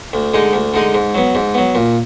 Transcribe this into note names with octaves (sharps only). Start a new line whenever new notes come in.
D2
D3 G#3 D#4 G#4
D2
D3 G#3 D#4 G#4
G#2
F#3 B3
G#2
F#3 B3
A#2